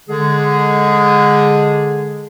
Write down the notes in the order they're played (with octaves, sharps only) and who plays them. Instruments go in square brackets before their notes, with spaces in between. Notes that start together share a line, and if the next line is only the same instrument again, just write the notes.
[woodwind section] D3 G#3 G#4